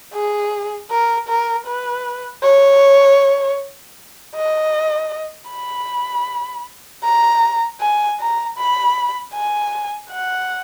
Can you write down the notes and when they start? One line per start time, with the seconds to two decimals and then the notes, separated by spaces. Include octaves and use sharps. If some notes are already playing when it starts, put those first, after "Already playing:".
0.14 G#4
0.91 A#4
1.29 A#4
1.67 B4
2.43 C#5
4.36 D#5
5.50 B5
7.04 A#5
7.81 G#5
8.20 A#5
8.58 B5
9.34 G#5
10.11 F#5